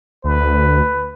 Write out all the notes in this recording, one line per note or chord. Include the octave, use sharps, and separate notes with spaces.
D2 B4